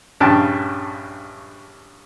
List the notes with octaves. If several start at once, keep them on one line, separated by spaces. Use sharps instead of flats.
A#1 G2 C#3 G5 A5